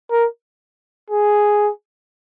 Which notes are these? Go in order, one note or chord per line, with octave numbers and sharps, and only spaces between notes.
A#4
G#4